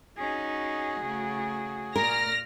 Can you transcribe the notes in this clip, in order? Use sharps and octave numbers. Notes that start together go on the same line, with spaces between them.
C#4 D#4 F#4 G#4
C#3 A3
A#2 A#4 D5 F6 A#6